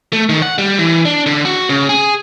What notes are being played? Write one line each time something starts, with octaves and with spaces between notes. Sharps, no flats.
A3
D#3
F#5
G3
E3
D4
D3
F#4
C#3
G#4